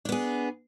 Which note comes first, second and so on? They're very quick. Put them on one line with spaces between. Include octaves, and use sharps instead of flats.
D4 B3 G#4